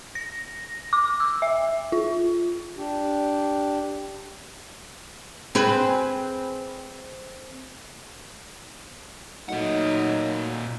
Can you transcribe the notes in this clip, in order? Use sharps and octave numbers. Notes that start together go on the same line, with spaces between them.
A#6
D6
E6
E5
F4
D4 G4
C4 G#4 B4
A#2 F#3 A3 D#4 F#5